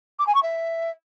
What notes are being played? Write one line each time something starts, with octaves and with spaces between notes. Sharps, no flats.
D6
G#5
C#6
E5